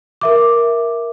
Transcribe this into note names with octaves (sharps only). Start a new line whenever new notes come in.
A#4 E5 D6